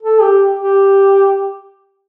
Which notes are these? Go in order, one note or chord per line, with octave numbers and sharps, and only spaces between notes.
A4
G4
G4